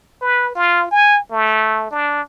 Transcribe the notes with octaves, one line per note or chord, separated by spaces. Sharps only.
B4
F4
G#5
A3
D4